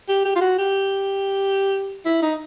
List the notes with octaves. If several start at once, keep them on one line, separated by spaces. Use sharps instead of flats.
G4
G4
F4
F#4
G4
E4
D#4